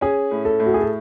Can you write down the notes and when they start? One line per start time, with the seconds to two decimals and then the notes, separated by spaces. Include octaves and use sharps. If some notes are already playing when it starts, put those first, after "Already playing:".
0.01 C#4 G#4
0.31 A2
0.45 A4
0.60 A2
0.66 F#4
0.74 G#4
0.81 A4